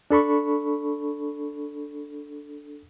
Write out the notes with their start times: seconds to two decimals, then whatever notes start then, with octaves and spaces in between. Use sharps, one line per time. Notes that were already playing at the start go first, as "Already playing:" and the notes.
0.11 D4 A4 B5 C#6